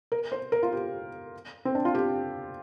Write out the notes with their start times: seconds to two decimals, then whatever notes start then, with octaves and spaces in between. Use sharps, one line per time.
0.12 A#4
0.32 C5
0.52 A#4
0.63 F4
0.72 G4
1.65 C4
1.75 D4
1.85 F4
1.95 G4